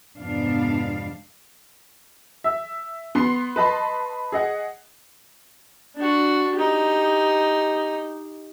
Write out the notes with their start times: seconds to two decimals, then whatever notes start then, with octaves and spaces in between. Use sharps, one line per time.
0.18 F2 G#2 C3 B3 D4 F5
2.44 E5
3.15 B3 C6 C7
3.56 B4 D#5 A5 B5 C6
4.32 G#4 D#5 F#5
5.96 D4 F#4
6.56 D#4 G4